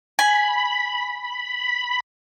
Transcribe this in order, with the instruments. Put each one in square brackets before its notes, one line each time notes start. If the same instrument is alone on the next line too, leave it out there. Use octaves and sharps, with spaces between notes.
[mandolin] G#5 [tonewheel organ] B5